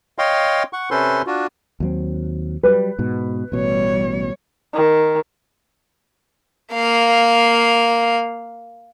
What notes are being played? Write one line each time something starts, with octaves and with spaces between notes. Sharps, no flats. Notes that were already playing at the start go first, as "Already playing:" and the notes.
C#5 D#5 F5 G5 C6
F#5 C#6
C3 C#4 A4 B4 C5 C6
D4 F4 F#4
D#2 F#3 C4
F#3 G3 B4
G#2 B2
A1 B2 G3 C#5
D#3
A#3 F5